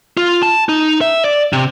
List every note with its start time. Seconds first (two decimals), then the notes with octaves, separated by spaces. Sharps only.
0.17 F4
0.43 A5
0.69 D#4
1.01 E5
1.24 D5
1.53 C3